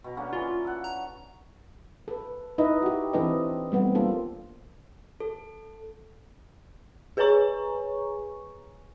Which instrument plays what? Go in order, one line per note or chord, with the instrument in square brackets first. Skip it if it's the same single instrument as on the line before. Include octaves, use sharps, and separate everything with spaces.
[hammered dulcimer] B2 A#5
D3 A#3 C#4
[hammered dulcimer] E3 C#4 [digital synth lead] F4
[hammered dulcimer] A4 F#5
[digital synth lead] A#5
[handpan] A4 B4
D#4 E4 B4 D#5 E5
F#4 G4
E3 C4 D4 A4 B4 D#5
G3 A3 B3 C4 G4
A#3 D4 F4 A4
[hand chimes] A4
[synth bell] G#4 B4 C#5 G#5 A#5 C#6